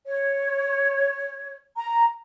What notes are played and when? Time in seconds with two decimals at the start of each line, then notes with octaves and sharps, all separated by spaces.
0.06 C#5
1.76 A#5